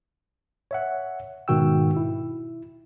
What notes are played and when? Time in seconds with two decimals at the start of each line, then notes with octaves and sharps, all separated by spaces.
0.71 C#5 E5 F#5
1.48 G#2 B2 D#3 F#4 G5 E6
1.97 E4